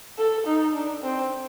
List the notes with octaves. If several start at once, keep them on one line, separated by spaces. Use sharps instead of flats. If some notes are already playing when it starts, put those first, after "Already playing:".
A4
D#4
D4
C4